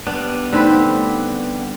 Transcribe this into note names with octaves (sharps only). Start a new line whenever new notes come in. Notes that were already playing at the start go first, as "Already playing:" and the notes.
G3 B3 D4
D3 A3 C4 D#4 B4